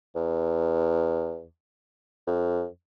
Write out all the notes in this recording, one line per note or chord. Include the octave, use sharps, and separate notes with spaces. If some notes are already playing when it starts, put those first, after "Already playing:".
E2
F2